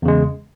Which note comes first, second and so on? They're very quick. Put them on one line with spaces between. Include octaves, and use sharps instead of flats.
E2 C#3 G#3